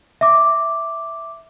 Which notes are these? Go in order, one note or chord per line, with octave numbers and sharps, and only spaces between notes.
E5 D6